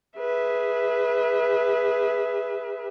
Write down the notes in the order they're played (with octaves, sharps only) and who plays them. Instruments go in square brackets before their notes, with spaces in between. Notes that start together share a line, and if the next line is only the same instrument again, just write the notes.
[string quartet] G#4 B4 E5